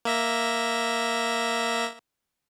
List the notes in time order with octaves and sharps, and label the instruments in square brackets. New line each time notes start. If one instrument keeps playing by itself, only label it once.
[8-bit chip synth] A#3 E5 A#6